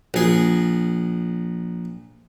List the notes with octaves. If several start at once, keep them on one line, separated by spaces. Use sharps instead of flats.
A#1 G#4